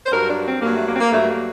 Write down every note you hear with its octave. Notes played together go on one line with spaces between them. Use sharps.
C5
G2 F#3 A#4
D4
C4
G2 F#3 A#3
A3
A#3
C4
A#3
G2 F#3 A3
A#3